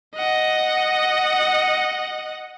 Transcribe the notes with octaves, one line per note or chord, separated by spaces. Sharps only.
D#5 F#5